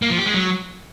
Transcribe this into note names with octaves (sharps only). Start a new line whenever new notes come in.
A#3
F3
G4
G#3
F#3